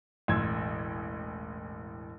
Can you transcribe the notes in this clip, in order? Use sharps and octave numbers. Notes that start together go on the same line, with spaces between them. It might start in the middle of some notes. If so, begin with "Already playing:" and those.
E1 A1 C6 E6 G#6